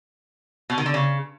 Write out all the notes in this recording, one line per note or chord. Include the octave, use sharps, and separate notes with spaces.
B2
D#3
D3
C#3